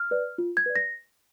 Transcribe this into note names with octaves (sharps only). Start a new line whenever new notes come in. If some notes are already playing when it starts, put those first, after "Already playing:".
Already playing: F6
B4 D5
F4
G#6
B4 D5
A#6